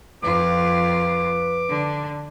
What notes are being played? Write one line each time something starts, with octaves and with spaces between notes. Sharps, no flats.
F2 F4 B4 D6
D3